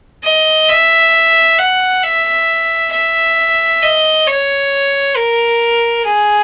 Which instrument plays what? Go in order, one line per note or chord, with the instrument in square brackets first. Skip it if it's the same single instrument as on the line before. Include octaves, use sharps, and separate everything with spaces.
[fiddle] D#5
E5
F#5
E5
E5
D#5
C#5
A#4
G#4